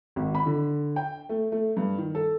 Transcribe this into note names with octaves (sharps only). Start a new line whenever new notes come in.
G#1
B5
D3
G5
A3
A3
G2
D#3
A4